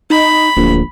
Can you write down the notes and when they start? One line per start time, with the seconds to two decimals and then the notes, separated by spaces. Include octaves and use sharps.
0.10 D#4 B5
0.57 D1 A#1